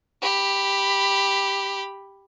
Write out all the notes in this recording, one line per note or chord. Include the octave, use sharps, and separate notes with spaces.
G4 B5